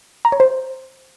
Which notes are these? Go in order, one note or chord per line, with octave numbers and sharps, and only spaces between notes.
A#5
C#5
C5